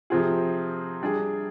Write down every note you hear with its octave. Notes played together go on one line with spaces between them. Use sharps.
C3 F3 C4 F4 G#4
G3 D4 G#4